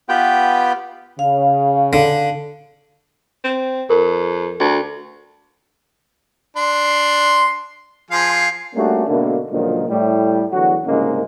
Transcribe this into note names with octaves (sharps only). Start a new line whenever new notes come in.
B3 F4 G4 B4 G5
C#3 F5
D3
C4
F2 A#4
D2
D4 C6
F3 G#4 F5
G3 A3 A#3 C#4 D4 F#4
G#2 B2 D3 A3 A#3
C#2 A#2 D3 D#3 F3 F#3
A2 G3
E2 D3 F#3 F#4
C2 G#2 C#3 G#3 A#3